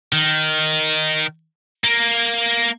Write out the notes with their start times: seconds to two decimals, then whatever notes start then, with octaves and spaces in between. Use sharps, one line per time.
0.13 D#3
1.84 A#3